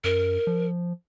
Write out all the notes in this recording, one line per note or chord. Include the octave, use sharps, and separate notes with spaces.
F#2 A#4
F3